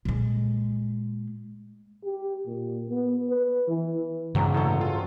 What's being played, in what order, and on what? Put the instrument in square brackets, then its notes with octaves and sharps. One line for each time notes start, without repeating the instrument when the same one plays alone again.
[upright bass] A#2 G#3
[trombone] G4
A#2
B3
B4
E3
[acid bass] G2 [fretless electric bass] C#3 E3 A#3 [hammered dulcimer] F#3 G#3 C4
[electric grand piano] A2 A4 [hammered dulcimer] G#3 C4
[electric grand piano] F4